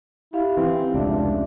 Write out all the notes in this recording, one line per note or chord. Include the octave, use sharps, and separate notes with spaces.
E4 G4 F5
E3 C4
F1 C#2 D4 D5 E5